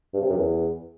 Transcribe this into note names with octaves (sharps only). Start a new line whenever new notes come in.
G2
C3
F#2
E2